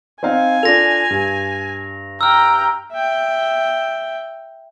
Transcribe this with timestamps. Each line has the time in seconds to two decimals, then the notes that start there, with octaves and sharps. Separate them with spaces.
0.23 C4 D#4 F5 G#5
0.63 D4 F4 A4 A#6 F7
1.10 G2
2.21 G5 A#5 E6 F6
2.92 E5 G5